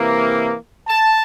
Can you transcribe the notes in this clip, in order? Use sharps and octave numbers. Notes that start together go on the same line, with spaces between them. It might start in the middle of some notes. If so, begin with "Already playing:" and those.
Already playing: C3 E3 A#3
A5